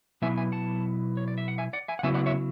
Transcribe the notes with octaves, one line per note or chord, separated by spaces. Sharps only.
B2 F#3 B3 E4 E5 G#5
E5 G#5
F#5 A5
C#5
D5
E5
F#5
E5 G#5
D5 F#5
E5 G#5
F#5
C#3 F#3 B3 E4 E5 G#5
D5 F#5
C#5 E5